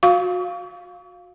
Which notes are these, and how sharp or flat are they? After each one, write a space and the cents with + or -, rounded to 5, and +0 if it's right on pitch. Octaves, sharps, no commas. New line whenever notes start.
F#4 -30 F5 +0 C#6 +35